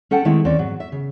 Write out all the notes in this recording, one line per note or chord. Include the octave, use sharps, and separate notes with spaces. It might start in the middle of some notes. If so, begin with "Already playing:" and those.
C#4 A4 F#5 G5 A5
D#3 G#3 A3 C4 E4
D#2 C4 C#4 D5
G#2 F#3
E5
C#3